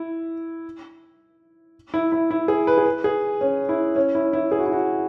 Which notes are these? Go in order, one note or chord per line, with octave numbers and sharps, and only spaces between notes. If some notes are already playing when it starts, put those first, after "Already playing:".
Already playing: E4
E4
E4
E4
G#4
B4
G#4
B4
G#4
C#4
E4
C#4
E4
E4
G#4
F#4
E4
F#4